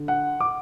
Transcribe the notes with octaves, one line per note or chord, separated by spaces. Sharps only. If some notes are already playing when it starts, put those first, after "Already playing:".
Already playing: D3
F#5
D6